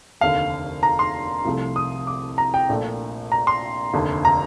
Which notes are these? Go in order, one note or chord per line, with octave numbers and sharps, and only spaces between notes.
F1 D#2 D3 F5
A#5
C6
C2 C3 F3 A3
D#6
D6
A#5
G5
A#1 A#2 A3 D4
A#5
C6
F1 D#2 D3
A#5